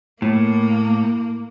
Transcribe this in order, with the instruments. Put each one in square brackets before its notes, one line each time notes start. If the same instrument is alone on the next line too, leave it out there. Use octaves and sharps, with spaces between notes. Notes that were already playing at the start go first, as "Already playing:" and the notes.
[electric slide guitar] A2 [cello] A#3